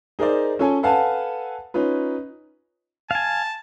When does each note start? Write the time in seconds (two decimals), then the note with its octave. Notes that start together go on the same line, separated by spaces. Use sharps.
0.19 D#4 G#4 A#4 C5 D5
0.59 C#4 F4 A4 C#5 G#5
0.83 A4 B4 F5 F#5 G#5 A5
1.74 C#4 D#4 F4 B4
3.11 F5 G#5 A5